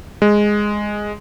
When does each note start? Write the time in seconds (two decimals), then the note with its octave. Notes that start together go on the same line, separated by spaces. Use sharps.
0.22 G#3